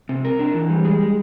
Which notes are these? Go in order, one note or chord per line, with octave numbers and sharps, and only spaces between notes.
C3
A#4
D4
E3
G3
G#3
G#3